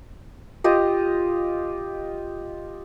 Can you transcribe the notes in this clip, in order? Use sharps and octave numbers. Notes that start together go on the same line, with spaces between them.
F4 G4 D#5